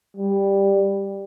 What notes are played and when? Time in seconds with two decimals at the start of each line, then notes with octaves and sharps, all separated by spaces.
0.17 G3